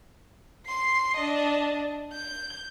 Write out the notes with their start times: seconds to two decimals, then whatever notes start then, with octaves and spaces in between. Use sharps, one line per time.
0.67 C6 C7
1.16 D4 D#5
2.13 G6